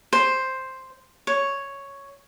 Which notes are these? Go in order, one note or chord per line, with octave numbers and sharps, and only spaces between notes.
C5
C#5